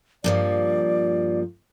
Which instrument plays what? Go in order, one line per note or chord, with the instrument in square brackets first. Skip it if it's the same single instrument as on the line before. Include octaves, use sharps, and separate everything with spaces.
[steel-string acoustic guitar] G2 A#2 F3 [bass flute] D5